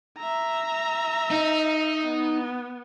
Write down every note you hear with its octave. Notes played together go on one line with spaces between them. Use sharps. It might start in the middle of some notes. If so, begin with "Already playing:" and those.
E5 A#5
D#4
B3